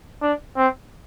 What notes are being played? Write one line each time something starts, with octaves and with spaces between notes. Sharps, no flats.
D4
C4